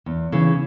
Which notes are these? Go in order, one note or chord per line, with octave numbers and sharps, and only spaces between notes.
E2
C#3 E3